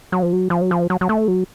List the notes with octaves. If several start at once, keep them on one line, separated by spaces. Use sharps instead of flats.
F#3
F3
F#3
F3
F#3
F3
F#3
F#3
A3
F#3